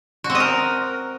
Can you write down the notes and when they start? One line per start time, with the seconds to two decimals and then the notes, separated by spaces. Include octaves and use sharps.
0.24 F#4
0.30 C4
0.35 D#5
0.40 A#4